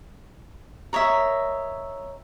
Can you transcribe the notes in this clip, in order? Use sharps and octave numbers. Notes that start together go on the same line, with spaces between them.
A#4 C#5 D#5 E5